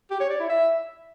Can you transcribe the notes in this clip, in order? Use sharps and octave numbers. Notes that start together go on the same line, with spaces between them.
G4
C#5
D5
E4
E5